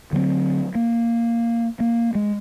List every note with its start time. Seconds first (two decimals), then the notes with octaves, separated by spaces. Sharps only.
0.13 D3 F#3 G#3 C4
0.75 A#3
1.80 A#3
2.15 G#3